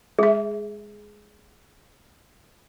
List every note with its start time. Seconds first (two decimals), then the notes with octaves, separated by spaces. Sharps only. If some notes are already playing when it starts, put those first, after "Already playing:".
0.19 G#3 G#4 E5